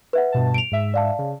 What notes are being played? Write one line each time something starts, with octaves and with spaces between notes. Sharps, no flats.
B4 E5 F#5
G2 B2 A5
D7 F7
G#2 E5
D5 F5 A5
C#3